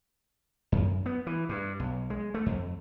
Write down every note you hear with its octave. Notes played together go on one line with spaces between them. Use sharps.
F#2
B3
E3
G2
B1
G#3
A3
F2